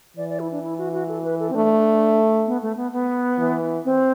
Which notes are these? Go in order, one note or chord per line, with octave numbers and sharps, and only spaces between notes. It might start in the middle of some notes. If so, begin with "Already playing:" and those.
E3 D5
D5
E4
D4
E4
F#4
F#4
A4
B4
A4
C4
A3 D4
B3
A3
B3
B3
E3
C4